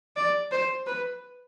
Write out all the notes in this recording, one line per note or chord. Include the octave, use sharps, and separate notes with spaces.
D5
C5
B4